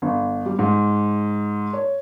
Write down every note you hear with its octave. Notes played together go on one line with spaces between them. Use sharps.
G1
G3
G#2
C#5